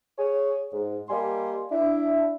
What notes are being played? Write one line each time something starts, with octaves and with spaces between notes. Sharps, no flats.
G#4 C#5
G#2
G3 A#3 D#5 G#5 C6
D4 E4